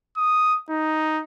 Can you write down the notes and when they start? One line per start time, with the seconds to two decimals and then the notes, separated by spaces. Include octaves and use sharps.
0.17 D#6
0.70 D#4